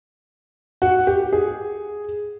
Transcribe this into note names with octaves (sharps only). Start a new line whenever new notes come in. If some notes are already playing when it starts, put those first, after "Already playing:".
F#4
G4
G#4